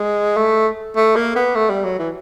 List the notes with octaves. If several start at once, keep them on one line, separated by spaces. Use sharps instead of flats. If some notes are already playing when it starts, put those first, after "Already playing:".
Already playing: G#3
A3
A3
A#3
B3
A3
G3
F#3
E3